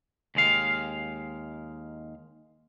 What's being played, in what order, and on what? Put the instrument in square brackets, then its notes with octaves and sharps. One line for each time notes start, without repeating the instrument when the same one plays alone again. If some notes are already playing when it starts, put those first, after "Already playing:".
[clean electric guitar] D#2 G#3 F5